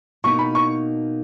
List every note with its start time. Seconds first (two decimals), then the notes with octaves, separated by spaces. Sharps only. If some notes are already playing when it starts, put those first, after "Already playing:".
0.24 B2 A#3 D#4 C#6
0.39 B5
0.55 C#6